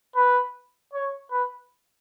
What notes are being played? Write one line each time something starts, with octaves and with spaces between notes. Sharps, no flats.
B4
C#5
B4